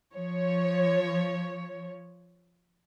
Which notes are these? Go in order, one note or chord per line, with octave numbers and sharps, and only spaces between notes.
F3 C#5